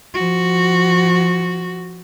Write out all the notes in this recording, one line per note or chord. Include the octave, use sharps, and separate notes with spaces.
F3 F#4